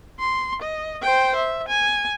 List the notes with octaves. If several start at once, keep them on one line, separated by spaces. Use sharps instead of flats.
C6
D#5
C5 G5
E5
G#5